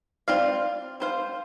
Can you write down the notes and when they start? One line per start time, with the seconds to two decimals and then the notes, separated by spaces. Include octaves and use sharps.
0.28 C4 F4 D5 F5
1.00 C4 F4 C5 F5